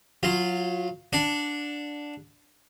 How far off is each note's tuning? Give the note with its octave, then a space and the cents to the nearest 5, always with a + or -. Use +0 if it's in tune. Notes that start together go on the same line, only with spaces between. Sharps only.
F#3 -25 F4 -5
D4 +0 F#5 -30